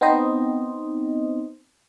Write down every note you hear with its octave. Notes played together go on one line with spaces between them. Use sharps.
B3 C4 D#4 C5 D#5